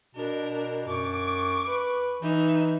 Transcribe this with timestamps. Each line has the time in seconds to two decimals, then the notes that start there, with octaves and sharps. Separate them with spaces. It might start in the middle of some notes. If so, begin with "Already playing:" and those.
0.15 B2 D4 A#4
0.87 F#2 C#6 D6
1.67 B4
2.22 E3 D#4 E5